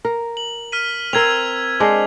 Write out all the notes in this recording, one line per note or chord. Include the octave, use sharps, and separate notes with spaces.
A#4
F#7
F6 B6 D#7
C4 A#4 E6 G#6 F7
G#3 D4 C5